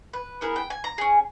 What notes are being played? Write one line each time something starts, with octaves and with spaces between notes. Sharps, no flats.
B4
B3 E4 G#4 A#4
G5
G#5
A#5
C#4 G#4